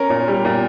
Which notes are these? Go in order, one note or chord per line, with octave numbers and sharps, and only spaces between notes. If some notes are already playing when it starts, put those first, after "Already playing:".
Already playing: C#4 A#4
A#2
G3
A#2